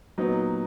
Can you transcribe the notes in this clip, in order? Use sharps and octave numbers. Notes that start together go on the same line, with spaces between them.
A#2 F#3 B3 D#4